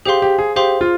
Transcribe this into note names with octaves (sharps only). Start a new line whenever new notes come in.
G4 G#4 C5 F5 C6
G4
G#4
G4 G#4 C5 F5 C6
F4